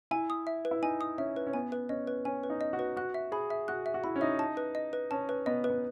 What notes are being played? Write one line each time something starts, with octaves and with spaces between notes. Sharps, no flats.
E4 G#5
D#6
E5
B4
E4
D#4 G#5
D#6
C#4 E5
B4
C#4
B3 G#5
B4
C#4 D#5
B4
C#4 G#5
B4
D#4
D#5
F#4
B4
F#4 F#6
E5
G#4 B5
E5
F#4 F#6
E5
F#4
E4 B5
C#4
D#4 E5
A5
B4
D#5
B4
C#4 A5
B4
B3 D#5
B4
B3